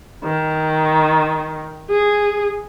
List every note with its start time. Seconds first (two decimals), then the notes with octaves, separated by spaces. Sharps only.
0.24 D#3
1.90 G#4